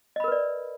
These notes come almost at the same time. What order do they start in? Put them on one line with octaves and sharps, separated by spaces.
D#5 B5 A#4 B4 D5